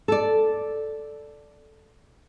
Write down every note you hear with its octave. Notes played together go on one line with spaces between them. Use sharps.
A4 D5